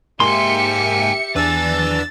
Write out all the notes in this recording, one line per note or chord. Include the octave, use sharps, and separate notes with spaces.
G#2 A#3 G4 E5 G5 G#5 C6 C#7
E2 D4 B4 G#5 E6 A6